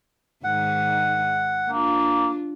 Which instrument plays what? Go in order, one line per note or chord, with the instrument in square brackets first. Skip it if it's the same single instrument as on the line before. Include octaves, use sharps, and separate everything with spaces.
[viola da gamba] G#2 D#3 D#4 [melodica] F#5
[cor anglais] A#3 [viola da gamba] D4 F4